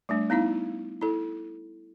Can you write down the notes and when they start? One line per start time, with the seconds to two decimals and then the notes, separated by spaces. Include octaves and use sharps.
0.09 G3 A3 D4
0.30 B3 D#4 E4 F5
1.01 E4 A4